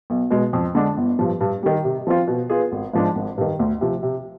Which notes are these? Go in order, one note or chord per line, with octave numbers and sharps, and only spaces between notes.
B1
B2 G#3
F2
D3 G#3 D4
G1
G2 F3
G2
D#3 G3
C3
F3 C4 F4
B2
B3 F4 G#4
G#1
G#2 F3 G#3 D4
G#1
G2 D#3
D2
C3 F3
C3